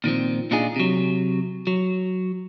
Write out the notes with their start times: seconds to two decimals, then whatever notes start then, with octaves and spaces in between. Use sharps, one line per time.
0.04 A#2 D#3 F3 C4
0.51 A#2 D4 D#4 F4 G#4
0.76 C3 F#3
1.67 F#3